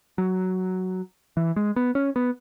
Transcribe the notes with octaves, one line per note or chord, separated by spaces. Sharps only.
F#3
E3
G#3
B3
C#4
B3